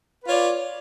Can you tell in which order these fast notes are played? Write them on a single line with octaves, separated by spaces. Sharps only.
B4 F4 C#5 D5